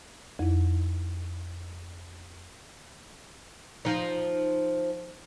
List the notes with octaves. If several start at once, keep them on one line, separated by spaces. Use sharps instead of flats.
F2 E4
F3 D#4